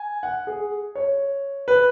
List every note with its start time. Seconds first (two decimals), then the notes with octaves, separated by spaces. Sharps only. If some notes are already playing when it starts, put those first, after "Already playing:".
Already playing: G#5
0.23 F#5
0.47 G#4
0.95 C#5
1.68 B4